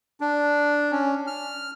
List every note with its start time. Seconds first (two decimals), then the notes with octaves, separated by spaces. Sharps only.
0.21 D4
0.92 C#4
1.27 F6